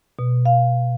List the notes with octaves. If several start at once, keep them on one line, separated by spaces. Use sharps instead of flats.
B2
F5